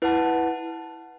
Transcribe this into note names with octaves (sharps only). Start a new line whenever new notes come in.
E4 B4 F#5 A5